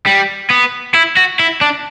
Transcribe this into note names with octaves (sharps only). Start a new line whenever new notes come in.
G3
B3
E4
F#4
E4
D4